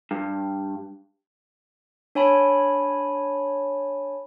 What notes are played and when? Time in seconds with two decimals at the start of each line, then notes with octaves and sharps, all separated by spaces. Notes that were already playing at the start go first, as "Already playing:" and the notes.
0.11 G2
2.15 D4 C#5 G#5 A5 B5